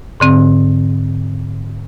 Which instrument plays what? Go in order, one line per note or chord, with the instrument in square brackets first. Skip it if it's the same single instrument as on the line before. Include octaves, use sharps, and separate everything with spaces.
[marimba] G#2 D3 C4